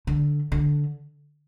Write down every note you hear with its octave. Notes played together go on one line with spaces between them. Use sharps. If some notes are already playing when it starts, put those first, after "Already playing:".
D3
D3